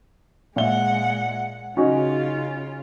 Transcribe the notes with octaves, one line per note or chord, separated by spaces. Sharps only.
A#2 G#3 E5 F#5 G7
C#3 C#4 D#4 F4 F#4